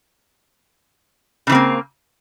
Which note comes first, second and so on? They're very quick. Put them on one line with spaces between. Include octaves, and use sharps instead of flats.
C#3 E3 C4 A#3